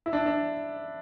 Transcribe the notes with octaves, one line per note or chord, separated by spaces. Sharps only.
E4
D4
D4